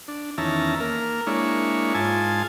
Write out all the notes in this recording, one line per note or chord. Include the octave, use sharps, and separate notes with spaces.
D4
E2 D#3 C#4 E5 A5 A#5
A#3 A#4
G#3 A#3 D4 E4 C#5
G#2 F4 G#5 A5